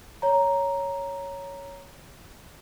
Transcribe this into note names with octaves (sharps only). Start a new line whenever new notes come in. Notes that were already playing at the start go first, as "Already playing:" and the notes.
C#5 A#5